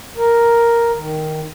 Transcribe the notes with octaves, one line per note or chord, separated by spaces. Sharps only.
A#4
D#3